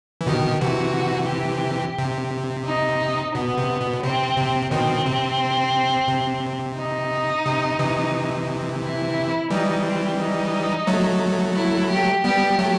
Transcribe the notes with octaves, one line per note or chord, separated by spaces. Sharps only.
E3
B2 D#3 G4
C3 E3 F#4
G4
C3
D#4
B2 B3
C3
B2
C3 C4
C3
B2 D#3 C4
C3
C3
D#4
C3
C3 E3
E4
E3 G3 D#4
C4
D#4
F#3 A3
E4
G4
G3 B3 G4
F#3 A3